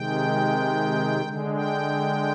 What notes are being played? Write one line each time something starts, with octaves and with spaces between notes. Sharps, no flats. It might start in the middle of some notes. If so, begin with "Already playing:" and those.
Already playing: C3 D#3 G#3 G5
D3 G#3
G5